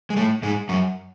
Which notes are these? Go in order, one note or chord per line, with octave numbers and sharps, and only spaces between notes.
G#3
A2 A3
G#2 G#3
F#2 F#3